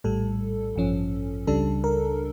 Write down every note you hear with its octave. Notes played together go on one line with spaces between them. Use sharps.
A#1 A2 G3 A4
A1 G2 F3 C#4
C#2 C#3 G3 D4 A4
A#4